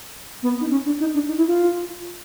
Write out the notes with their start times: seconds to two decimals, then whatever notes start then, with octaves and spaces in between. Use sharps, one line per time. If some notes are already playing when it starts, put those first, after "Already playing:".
0.43 B3
0.61 D#4
0.70 C#4
0.86 D4
1.00 D#4
1.14 D4
1.28 D#4
1.37 E4
1.47 F4